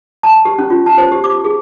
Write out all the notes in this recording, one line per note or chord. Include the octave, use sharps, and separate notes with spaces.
A5
G4
C#4
F4
A5
C5
G4
D6
G#4